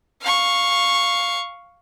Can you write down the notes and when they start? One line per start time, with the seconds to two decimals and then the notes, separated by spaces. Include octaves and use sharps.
0.22 F5 C#6